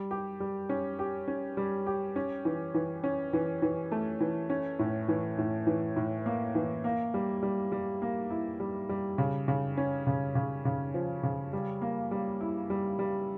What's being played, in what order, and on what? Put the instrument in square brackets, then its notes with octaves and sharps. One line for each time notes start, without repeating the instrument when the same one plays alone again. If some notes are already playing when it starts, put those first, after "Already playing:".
Already playing: [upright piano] G3
G4
G3
C#4
G4
C#4
G3
G4
C#4
E3
E3
C#4
E3
E3
A3
E3
C#4
A2
E3
A2
E3
A2
A#3
E3
A#3
G3
G3
G3
A#3
E4
G3
G3
C#3
C#3
C#4
C#3
C#3
C#3
F3
C#3
G3
A#3
G3
E4
G3
G3